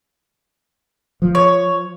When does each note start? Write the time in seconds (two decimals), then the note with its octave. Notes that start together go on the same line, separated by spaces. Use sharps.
1.22 F3
1.35 C#5